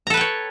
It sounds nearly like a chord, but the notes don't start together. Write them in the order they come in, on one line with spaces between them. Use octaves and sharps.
A#5 A4 B4 G5 C#5